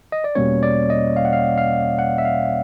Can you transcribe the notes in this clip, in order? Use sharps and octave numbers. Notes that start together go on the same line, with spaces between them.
D#5
D5
E2 B2 G3 A#3 C#4 C#5
D5
D#5
F5
F#5
F5
F5
F#5
E5
F5